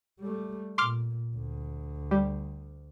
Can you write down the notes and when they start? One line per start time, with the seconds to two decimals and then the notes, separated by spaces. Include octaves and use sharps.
0.20 G3 A3
0.78 A#2 C6 D6 F6
1.36 D2
2.11 G3